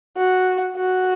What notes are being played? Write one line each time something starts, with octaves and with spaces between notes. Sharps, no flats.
F#4
F#4